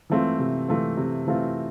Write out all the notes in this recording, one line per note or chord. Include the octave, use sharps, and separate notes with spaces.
E3 A3 C4 F4
C3
E3 A3 C4 F4
C3
E3 A3 C4 F4